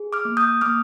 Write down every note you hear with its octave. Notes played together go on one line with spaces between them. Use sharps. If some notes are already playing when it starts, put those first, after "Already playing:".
Already playing: G#4
D6 F6
A#3
D#6 G6
A#3 D6 F6